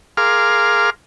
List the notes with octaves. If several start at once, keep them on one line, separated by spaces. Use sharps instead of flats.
G#4 A#4 F5 C6 D6 F6